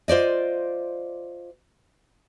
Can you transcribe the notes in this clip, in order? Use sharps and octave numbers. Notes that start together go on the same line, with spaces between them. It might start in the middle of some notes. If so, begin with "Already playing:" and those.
F4 C5 D5 D#5